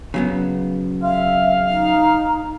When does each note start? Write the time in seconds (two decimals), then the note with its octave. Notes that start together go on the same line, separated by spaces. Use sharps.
0.14 C#3 F#3 B3
1.03 E5 F5
1.69 D#4